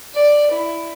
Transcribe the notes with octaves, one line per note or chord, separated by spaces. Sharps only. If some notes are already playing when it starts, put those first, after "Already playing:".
D5
E4